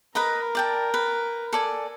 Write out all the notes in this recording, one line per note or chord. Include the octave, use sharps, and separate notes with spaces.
A#4 B4 D#5 A#5
D5 G5 A5
B4
A4 D5 G#5